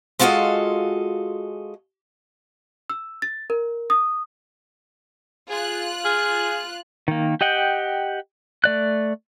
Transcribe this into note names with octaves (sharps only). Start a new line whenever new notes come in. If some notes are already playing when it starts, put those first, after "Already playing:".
G#3 F4 F#4 A4 D#5 F5
E6
A6
A#4
D#6
F4 G#4 F#6
G#4 F6
D#3 A#3
G4 D#5 F#5 G5
A3 D5 F#6